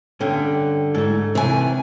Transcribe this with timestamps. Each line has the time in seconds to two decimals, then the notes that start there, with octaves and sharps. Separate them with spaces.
0.21 G2 D3 C#4 G5
0.95 G#2 A3 A4
1.35 C3 D#3 E3 G3 G#5